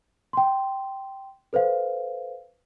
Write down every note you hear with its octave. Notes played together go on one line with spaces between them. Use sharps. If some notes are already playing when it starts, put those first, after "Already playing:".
G5 C6
A4 B4 C5 F5